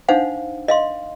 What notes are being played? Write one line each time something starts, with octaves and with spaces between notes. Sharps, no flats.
D4 D#4 C5 F5 F#5
D#5 F5 C6